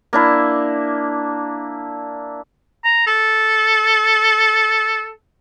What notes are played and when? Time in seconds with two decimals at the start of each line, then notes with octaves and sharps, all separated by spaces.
0.13 A#3 D4 E4
2.84 A#5
3.07 A4